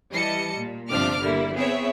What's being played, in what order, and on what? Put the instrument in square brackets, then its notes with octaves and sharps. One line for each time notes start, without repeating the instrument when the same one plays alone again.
[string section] E3 G3 D#5 A5 C#7
A#2
G1 C3 F3 D4 D6 F6
D3 G3 A#3 E4
B3 C4 E4 G#4 C#5 E5